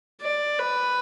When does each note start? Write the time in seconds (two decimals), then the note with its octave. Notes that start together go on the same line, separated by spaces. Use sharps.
0.21 D5
0.59 B4